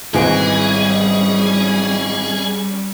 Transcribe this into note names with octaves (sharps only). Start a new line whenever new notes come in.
G#1 E3 G3 G#3 C#4 G#4 D#5 D7